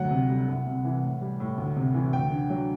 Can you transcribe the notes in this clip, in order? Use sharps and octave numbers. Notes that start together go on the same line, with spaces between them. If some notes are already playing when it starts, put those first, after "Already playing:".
Already playing: D2 F#3 F#5
C3
G3
C2
C3
E3
A2
G3
A2
D2
C3
E3
D2 G5
D3
F#3